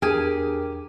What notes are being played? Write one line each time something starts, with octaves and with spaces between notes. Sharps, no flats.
E2 D4 G4 G#4 A#4 G#5 F6